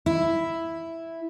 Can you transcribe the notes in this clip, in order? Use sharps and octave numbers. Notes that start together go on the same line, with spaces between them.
E4